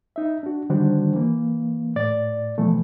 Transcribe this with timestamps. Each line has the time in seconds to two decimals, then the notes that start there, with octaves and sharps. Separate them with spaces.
0.16 D#4 E5
0.43 D4 F#4
0.70 D3 D#3 G3 D4 F#4 C5
1.14 E3 A#3
1.96 A2 D5 A6
2.58 B2 E3 F3 A3